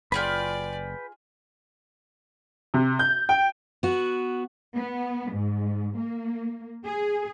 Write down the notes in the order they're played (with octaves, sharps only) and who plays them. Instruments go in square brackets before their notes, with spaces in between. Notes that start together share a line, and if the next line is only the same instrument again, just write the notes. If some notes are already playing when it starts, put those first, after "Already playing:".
[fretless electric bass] F#1 [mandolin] F4 G#4 B5 [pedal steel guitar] B4 G5 [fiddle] D5
[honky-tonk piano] C3
G6
G5
[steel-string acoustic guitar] B3 F#4
[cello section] B3
G#2
A#3
G#4